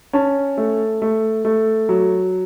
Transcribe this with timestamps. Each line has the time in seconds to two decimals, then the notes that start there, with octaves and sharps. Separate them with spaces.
0.13 C#4 A5
0.57 A3
1.02 A3
1.45 A3
1.89 F#3